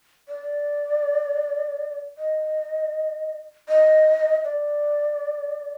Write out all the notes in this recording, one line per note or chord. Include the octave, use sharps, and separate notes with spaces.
D5
D#5
D#5
D5